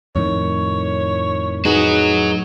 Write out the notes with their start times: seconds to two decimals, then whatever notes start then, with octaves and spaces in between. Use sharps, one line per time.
0.16 F2 A2 D#3 C#5
1.65 F#3 D#4 F#4 G#4 B4